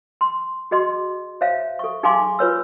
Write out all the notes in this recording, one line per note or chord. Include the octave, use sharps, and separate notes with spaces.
C6
F#4 G#4 D#5 C6
C5 C#5 E5 F5
A4 C#6
D#4 G#4 F5 G#5 C6 D6
F4 B4 C#5 E6